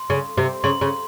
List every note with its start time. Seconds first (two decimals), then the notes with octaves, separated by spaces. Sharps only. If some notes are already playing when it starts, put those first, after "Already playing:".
Already playing: C6
0.10 C#3
0.38 C3
0.64 C#3 C6
0.81 C#3